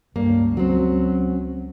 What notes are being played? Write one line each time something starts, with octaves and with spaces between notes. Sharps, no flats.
C#2 G2 A#3 C#4
F#3 C4